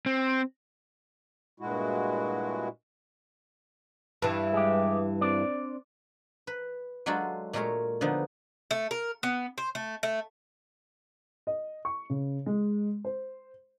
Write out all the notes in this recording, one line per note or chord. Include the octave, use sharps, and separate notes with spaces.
C4
G2 A#2 G#3 E4 F#4
G2 E3
G#3 G4
C4 D4 D5
B4
F#3 G#3 D4 F4 F#4 A4
A#2 G#3 A3 A#4 C#5 A#5
D3 F3 B3 D#4
A3
A#4
B3
C5
A3
A3
D#5
C#6
C#3
G#3
C5